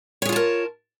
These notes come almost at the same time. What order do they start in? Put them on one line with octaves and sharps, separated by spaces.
C#5 G#4 F4 A5 A#4